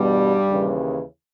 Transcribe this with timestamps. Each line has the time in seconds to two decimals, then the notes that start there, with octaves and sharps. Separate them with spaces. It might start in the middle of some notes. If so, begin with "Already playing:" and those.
Already playing: E2 G2 B2 G3
0.49 D#2 C#3 E3